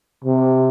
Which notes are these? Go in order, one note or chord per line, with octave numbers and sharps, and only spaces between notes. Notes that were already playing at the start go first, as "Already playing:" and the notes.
C3